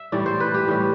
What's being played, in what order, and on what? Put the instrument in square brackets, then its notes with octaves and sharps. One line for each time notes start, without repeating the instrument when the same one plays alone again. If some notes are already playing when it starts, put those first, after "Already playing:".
Already playing: [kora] E5
A2 E3 G3 D5
C5
B4
G4
A2 E3 G3